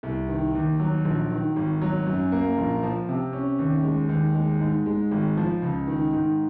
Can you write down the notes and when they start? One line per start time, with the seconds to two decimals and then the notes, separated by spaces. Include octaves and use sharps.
0.03 C2
0.28 D#3
0.55 D#2
0.80 F#3
1.05 A#1
1.31 D#3
1.56 G#1
1.81 F#3
2.07 F#2
2.32 A#3
2.58 A#1
2.83 F3
3.09 C3
3.33 C#4
3.59 D#2
3.84 G#3
4.09 D#2
4.35 G#3
4.61 G#2
4.86 G#3
5.11 G#1
5.37 F3
5.62 C#2
5.87 D#3
6.13 G#2